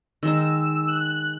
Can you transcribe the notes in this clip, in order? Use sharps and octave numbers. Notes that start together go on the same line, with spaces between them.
D#3 G#3 D#4 E6
F#6